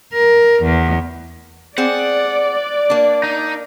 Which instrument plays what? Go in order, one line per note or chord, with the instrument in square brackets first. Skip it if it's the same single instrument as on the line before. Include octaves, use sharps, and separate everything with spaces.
[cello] A#4
E2
[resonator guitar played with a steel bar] C4 G#4 [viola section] D5 [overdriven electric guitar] F#5
[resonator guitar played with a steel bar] A#3 D4
[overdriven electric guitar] D#4